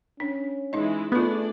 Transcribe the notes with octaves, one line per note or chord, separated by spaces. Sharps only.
C#4 D4
E3 G#3 D#4 E4 D#5
A3 B3 D4 F4 G#4 B4 D5